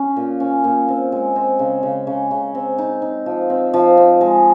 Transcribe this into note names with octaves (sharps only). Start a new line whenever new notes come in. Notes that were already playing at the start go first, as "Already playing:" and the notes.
Already playing: C#4
A#2
C#4
A#2
C4
G#3
C4
C#3
C#3
C#3
C#3
C4
D#4
D#4
F3
C4
F3
C4
G#3